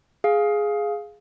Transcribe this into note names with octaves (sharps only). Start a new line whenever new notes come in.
G#4 F5